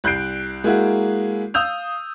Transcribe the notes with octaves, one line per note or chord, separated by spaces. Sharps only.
C2 F#6 G6 C7 D7
G#3 A#3 E4 F#4 G#4
F5 D#6 E6 G6 F7